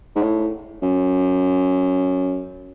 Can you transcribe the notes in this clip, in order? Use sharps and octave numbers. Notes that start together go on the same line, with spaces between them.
G#2
A2
F#2